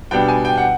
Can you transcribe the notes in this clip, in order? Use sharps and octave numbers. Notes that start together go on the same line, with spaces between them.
B2 G3 B3 D4 G5
G#5
G5
F#5